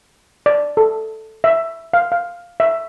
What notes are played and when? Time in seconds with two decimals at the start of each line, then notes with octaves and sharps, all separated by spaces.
0.46 D5
0.77 A4
1.44 E5
1.93 F5
2.12 F5
2.60 E5